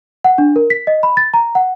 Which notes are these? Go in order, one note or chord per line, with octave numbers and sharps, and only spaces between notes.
F#5
D4
A#4
B6
D#5
B5
A6
A#5
F#5